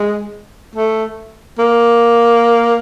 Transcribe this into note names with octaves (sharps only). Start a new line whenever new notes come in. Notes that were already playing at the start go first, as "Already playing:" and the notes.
Already playing: G#3
A3
A#3